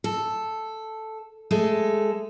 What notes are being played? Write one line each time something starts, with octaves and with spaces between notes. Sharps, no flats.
A4
G#3 A3 A4